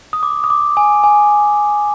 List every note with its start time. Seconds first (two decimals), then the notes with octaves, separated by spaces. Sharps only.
0.13 D#6
0.23 D6
0.44 D#6
0.50 D6
0.77 G#5
1.04 G#5